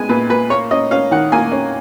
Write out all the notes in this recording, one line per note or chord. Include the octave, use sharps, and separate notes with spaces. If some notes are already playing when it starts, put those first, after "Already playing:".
Already playing: G#3 B3 G#5
A#2 B4
A#2 B4
A#3 C#5
C#4 D#5
C#4 F5
D#3 F#5
A#3 G#5
C#4